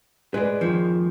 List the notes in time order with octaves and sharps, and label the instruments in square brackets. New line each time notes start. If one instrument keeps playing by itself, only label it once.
[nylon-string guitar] G#3 [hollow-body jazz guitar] B4 D5
[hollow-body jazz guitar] F2 D#3 F3